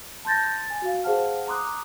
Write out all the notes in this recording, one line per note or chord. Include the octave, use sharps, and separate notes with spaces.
A5 C6 G6 A6 A#6
G#5 A6
F#4 F5
G#4 C5 F5 F#5 A5 F6
A#5 C6 D6 D#6 F#6